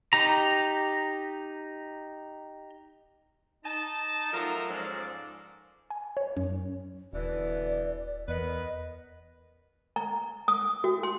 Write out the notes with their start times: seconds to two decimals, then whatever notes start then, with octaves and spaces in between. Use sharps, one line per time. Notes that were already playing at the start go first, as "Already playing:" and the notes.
0.13 D#4 G4 A#5
3.64 D#4 A5
4.33 F3 F#3 A3 A#4 A#5
4.69 G#2 F3 C#4 A4 D5
5.90 G#5
6.17 C#5
6.36 F#2
7.13 D#1 B2 D3 E3 D5
8.28 E2 B3 A#4 B4 D#5
9.96 A#5
10.48 D#6
10.84 F#4
11.03 C6